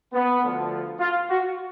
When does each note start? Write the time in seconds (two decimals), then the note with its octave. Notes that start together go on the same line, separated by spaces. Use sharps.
0.13 B3
0.42 D2 D3 F3
1.00 F4
1.28 F#4